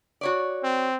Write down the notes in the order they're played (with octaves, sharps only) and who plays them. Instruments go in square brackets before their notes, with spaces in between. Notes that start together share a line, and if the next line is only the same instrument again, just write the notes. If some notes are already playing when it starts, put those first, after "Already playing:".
[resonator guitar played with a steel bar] F#4 C#5 D5
[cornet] C4